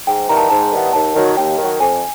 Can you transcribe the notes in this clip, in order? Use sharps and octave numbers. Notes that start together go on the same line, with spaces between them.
G#2 G5
D#3 G3 B3 E4 A#5
A5
G#2 A5
D#3 G3 B3 E4
D#2 A5
D#3 F#3
D#2 G5
D#3 F#3
F2 G#5